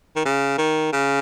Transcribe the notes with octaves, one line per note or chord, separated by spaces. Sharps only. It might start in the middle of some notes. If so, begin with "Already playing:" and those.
D#3
C#3
D#3
C#3